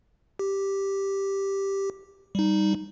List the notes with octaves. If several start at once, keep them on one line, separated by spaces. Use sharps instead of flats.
G4
G3 D#4